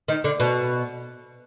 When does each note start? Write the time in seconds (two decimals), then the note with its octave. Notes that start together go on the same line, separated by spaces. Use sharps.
0.08 D#3
0.24 D3
0.40 B2